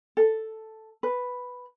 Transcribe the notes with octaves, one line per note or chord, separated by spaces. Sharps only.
A4
B4